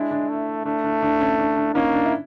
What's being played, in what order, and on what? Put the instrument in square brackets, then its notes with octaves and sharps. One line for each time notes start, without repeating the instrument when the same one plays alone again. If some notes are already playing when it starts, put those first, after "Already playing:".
Already playing: [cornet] G#3 [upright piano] D4 E4
[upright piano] D4
[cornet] A3
[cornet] A3 [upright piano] D4
[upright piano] D4
D4
C#4
D4
D4
[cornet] A#3 [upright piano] C#4 D#4
[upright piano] D4
E4